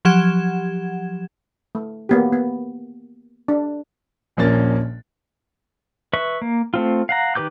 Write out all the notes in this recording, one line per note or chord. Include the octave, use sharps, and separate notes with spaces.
F3 F#3 G4 F#5 G#6 E7
A3
A#3 B3 G4
B3
D4
D#1 A#1 F3 A#3 C#4 A6
B4 E5 C#6
A#3
A3 C4 F4
F5 F#5 A#5
D#3 G4 B4 D6 G6